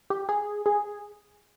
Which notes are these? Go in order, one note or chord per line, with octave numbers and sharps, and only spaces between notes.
G4
G#4
G#4